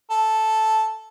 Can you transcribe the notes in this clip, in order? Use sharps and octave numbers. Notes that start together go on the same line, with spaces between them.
A4